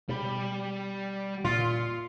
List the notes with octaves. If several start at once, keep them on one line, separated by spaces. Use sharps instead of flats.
B2 G3 B5
A#2 F4